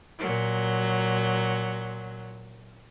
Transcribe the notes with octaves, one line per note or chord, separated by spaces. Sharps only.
A#2 F#3